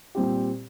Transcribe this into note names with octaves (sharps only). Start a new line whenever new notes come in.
A#2 G3 C4 G4